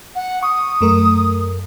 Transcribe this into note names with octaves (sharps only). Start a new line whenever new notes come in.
F#5
C#6 D#6
F#2 A3 A#4